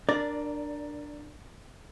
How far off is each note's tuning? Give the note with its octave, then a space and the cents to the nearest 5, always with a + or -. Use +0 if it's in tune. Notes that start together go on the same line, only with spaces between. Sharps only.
D4 +10 A#4 +0 D5 -10